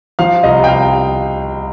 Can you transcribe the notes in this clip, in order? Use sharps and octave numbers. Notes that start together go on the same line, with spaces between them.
F3 F5
C2 D#5
G5
C2 F5